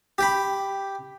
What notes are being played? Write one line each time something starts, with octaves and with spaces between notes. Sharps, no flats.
G4 G5 B5